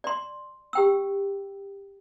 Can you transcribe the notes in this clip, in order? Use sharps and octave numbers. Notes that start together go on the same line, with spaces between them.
D5 C6
G4 G5 E6